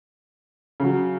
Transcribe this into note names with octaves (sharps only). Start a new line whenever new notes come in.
C#3 F#3